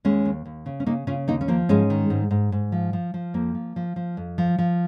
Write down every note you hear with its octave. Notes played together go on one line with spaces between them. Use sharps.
D#2 G#3 C#4
D#2
D#2
C#3
C#4
C#3 A#3 D#4
C#3 C#4 F4
D#2 A#3 D#4
C#4
F3 A#3
G#2 G#3 C#4
D#3
G#2
G#2
G#2
F3
F3
F3
F2 A#3
F3
F3
F3
F2
F3
F3